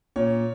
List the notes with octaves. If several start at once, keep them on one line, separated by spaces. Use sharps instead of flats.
A#2 C#5